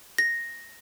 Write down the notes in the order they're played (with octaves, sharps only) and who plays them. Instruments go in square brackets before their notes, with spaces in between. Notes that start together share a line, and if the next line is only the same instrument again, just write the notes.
[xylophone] A#6